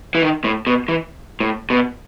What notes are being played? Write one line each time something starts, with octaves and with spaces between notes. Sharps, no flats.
E3
D#3
A2
B2
E3
A2
B2